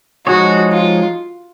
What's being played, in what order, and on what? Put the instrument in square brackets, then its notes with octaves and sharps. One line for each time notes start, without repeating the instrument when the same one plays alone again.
[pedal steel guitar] F3 G#3 D#4 G#4 C#5 [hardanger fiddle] F#4
[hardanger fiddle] F4